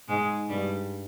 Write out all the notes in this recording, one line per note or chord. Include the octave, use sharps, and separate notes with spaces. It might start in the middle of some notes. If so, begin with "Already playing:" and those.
G#2 G#3
G2 G3